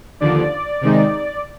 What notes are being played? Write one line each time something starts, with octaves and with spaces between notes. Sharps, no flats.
D#2 D3 F3 D5
C3 D#3 G#3 D#4